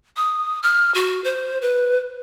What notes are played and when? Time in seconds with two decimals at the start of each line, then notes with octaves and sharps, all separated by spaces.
0.17 D#6
0.63 F6
0.95 F#4
1.24 C5
1.62 B4